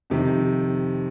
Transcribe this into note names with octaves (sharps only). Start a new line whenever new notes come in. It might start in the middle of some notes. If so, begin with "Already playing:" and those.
F2 C3 D#3